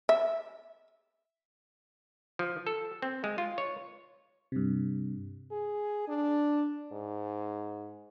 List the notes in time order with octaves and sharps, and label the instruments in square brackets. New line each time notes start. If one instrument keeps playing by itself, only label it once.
[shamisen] E5
[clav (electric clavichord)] F3
A4
C4
G#3
F4
C#5
[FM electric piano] G2 C3
[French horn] G#4
D4
G#2